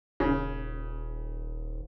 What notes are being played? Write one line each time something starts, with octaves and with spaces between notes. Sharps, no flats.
D#1 C#3